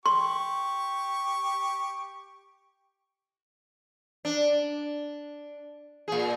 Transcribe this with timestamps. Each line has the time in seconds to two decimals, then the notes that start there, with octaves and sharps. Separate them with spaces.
0.06 G4 C6 C#6
4.25 D4
6.08 A#2 G#4